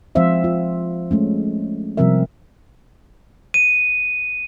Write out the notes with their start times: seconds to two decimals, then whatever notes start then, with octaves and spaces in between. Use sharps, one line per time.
0.15 F3 G#3 C4 C5 E5 F5
0.44 F4
1.11 G#3 A3 C#4
1.97 C3 F3 G3 C4 A#4 E5
3.54 D#7